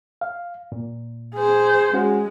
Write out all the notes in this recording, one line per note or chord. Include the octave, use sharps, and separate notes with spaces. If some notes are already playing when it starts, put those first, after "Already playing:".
F5
A#2
G#4 C5
G#3 C#4 F#4 F#5